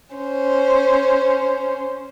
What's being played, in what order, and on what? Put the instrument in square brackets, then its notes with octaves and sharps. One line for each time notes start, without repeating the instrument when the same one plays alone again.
[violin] C#4 C5